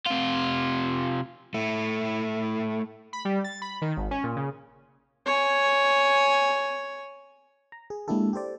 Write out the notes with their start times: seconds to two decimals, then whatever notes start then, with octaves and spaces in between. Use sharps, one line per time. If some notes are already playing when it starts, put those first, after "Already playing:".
0.06 C3 F4
1.54 A3 E4
3.13 B5
3.25 G3
3.44 A6
3.62 B5
3.82 D#3
3.97 G#1
4.11 C#4
4.24 A#2
4.36 C#3
5.26 C#5 G#5
7.72 A#5
7.90 G#4
8.08 G#3 A#3 D4 E4 G4 A4
8.33 G4 A4 C5 D5